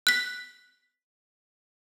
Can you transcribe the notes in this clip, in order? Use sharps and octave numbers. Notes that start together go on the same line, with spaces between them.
F#6 B6